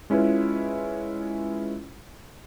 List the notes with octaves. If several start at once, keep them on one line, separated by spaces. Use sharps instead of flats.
G#3 C#4 E4 F4 B4